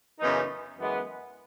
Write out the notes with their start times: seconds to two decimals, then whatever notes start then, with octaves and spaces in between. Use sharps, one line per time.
0.20 F#2 C#3 E3 B3 D#4
0.79 F#2 E3 G#3 B3